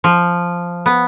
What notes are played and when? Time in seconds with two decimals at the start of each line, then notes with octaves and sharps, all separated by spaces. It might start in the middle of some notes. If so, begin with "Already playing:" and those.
0.04 F3
0.86 B3